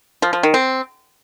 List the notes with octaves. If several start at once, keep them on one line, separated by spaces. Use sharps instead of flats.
F3
F3
D#3
C4